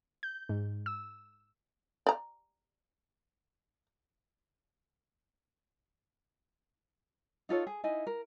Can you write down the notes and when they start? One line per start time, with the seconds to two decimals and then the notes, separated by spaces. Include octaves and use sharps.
0.23 G6
0.49 G#2
0.86 E6
2.06 D5 A#5
7.49 D#4 F4 A4 C#5
7.67 G#4
7.84 D#4 E4 D#5 G#5
8.07 A#4